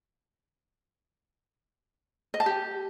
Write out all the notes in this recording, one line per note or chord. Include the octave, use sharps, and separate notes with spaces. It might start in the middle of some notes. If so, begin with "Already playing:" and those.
D#5
A5
G4